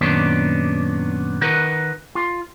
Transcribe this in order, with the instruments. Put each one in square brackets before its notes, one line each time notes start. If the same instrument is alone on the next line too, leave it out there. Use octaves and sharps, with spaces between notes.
[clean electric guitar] F#2 A#2 D#3 B3 C#4 D4
D#3 D#4 A#4 B4 F#5
F4